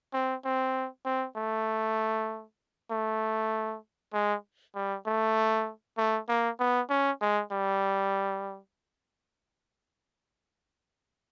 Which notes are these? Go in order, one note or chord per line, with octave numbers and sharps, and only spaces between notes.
C4
C4
C4
A3
A3
G#3
G3
A3
A3
A#3
B3
C#4
G#3
G3